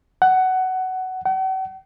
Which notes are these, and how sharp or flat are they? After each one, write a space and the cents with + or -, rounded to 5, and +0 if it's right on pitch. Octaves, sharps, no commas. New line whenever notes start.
F#5 +15
F#5 +45